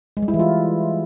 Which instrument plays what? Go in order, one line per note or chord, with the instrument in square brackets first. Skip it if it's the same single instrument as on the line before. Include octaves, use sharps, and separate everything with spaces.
[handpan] G#3
G3
E4
E3
F4